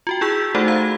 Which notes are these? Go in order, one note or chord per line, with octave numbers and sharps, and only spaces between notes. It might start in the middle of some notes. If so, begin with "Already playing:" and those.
F4 F#4 G5
E4 G#4 E6 G6 B6
A3 D#4 F#4 A4 C5 F#5
F5 A#5 G#6